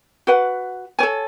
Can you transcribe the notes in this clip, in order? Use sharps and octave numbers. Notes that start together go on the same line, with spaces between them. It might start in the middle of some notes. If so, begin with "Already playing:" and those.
F#4 B4 F#5
A4 C#5 G#5